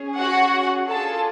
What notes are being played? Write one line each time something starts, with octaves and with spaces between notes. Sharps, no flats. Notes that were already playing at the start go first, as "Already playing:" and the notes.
Already playing: C#4 G#4
F#4 F#5
D4 F4 G#4 A4 A5